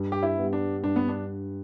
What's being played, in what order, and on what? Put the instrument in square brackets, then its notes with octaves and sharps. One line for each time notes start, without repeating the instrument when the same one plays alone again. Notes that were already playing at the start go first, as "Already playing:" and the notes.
Already playing: [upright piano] G2
[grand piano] G4
E4
[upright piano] G3 B3
[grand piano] D4
[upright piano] G2 [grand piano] D4
[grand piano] B3
D4